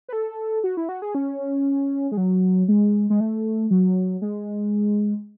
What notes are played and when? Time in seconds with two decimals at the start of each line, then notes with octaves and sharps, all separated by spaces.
0.08 B4
0.13 A4
0.64 F#4
0.77 E4
0.89 F#4
1.02 G#4
1.15 C#4
2.12 G#3
2.17 F#3
2.68 G#3
3.10 G#3
3.20 A3
3.71 F#3
4.22 G#3